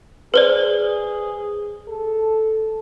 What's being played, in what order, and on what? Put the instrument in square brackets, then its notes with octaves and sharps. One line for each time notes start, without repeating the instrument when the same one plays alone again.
[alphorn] G#4 [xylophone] B4 C5 D5
[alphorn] A4